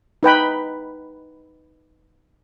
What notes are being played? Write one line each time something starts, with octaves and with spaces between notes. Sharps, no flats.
D#4 B4 G5 B5